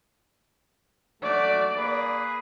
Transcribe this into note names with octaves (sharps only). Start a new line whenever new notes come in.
F#3 A3 F#4 D5
A#3 G#4 B4